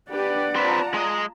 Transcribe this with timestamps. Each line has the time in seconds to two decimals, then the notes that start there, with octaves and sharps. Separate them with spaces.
0.11 D4 G4 B4 D5 F#5
0.56 C4 F4 B4 A5 A#5
0.94 G#3 D#5